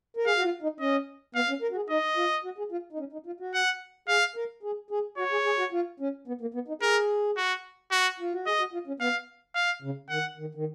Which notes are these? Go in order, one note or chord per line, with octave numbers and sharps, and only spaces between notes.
A#4
G#4 F5
F#4
F4
D#4
C#4 D#5
B3 F5
C#4
A#4
F#4
G#4
D#4 D#5
F4
F#4
G#4
F4
D#4
C#4
D#4
F4
F#4
F#5
G#4 F5
A#4
G#4
G#4
F#4 C#5
G#4
G#4
F#4
F4
C#4
B3
A#3
B3
D#4
G#4 A#4
F#4
F#4
F4
F#4
G#4 D#5
F#4
F4
C#4
B3 F5
F5
C#3
D#3 F#5
D#3
D#3